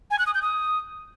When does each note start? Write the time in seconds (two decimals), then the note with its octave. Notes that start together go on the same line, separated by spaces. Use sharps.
0.11 G#5
0.19 F#6
0.27 D#6
0.34 G6
0.42 D#6